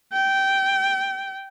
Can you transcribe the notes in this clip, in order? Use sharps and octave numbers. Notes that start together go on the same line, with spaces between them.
G5